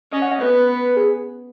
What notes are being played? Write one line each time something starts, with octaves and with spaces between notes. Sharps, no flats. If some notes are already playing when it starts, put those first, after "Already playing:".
C#4 D#5
F#5
D#5
B3 B4
G#4